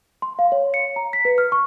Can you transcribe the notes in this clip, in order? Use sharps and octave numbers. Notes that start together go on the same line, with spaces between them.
C6
F5
C#5
C#7
A#5
B6
B4
F6
C#6